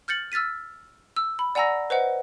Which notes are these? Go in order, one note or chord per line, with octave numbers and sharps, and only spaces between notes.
F6 G6 A6 C#7 F#7
E6 F6 A6 B6 D#7
E6
B5
D5 F#5 G#5 A#5 E6 A#6
B4 C5 D#5 F#5